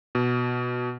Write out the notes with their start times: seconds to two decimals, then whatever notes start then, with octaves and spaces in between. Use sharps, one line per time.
0.15 B2